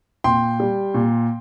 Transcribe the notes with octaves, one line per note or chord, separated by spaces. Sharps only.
A#2 G5 C6
G3
A#2